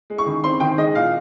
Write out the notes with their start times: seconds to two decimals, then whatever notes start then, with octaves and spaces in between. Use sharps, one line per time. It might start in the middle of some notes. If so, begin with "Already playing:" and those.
0.10 G#3
0.18 C#6
0.26 D#3
0.44 C4 C6
0.60 D#3 G5
0.77 G#3 D#5
0.95 A#2 F5